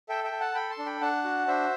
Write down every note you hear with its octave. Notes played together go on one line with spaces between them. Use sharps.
A4 E5 G5
E5 G5
A4
F#5 A5
A4 G5 B5
A5 C6
D4
G5 B5
D4 F#5 A5
F#4
D4 C5 E5